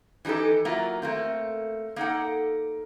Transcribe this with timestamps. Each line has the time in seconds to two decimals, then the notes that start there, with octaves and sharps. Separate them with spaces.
0.25 E3 G3 D#4 G4 A4
0.65 F#3 A#3 E4 F4
1.02 A3 A#3 C4
1.96 A#3 D#4 A4 F#5